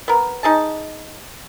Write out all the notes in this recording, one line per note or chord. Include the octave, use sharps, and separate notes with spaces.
B3 A#4
D#4 G#4 A5